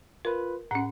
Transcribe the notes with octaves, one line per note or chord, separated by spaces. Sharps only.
F4 A#4 B4
A2 C#4 F#5